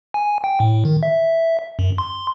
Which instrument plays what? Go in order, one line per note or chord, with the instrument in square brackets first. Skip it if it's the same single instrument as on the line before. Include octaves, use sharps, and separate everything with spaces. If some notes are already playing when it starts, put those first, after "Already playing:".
[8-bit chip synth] G#5
G5
A2
D#3
E5
F#2
C6